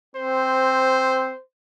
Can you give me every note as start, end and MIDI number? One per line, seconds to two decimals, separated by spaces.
0.16 1.33 60
0.16 1.41 72